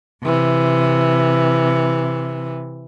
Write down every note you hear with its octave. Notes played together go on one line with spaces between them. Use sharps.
C3 E3